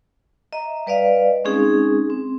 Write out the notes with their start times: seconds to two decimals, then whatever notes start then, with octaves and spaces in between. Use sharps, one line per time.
0.53 D#5 E5 A#5
0.87 G3 B4 D5 D#5 F5
1.45 G#3 C4 C#4 D#4 G#4
2.10 C4